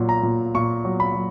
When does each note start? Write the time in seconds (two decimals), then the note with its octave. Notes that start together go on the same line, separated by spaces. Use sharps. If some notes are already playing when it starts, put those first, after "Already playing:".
Already playing: A#2 F#3
0.09 A#5
0.23 A#2
0.55 A#2 C#6
0.85 F#3
1.00 B5
1.15 F#3